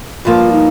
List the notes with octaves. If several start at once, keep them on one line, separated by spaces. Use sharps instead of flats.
G2 F3 A#3 F4
D#4